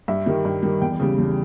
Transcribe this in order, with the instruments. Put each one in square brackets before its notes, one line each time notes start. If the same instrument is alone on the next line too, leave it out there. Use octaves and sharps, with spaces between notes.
[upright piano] G2 E5
D#3 G3
G2
D#3 G3
E2 G5
C#3 G3
E2